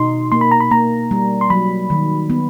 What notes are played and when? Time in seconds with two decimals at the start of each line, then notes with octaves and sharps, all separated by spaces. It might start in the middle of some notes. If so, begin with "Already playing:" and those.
Already playing: B2 D#4 C6
0.32 A#3 C6
0.41 B5
0.51 A#5
0.60 B5
0.71 A#3 A#5
1.11 G3
1.41 C6
1.50 F#3 B5
1.90 D#3
2.30 B3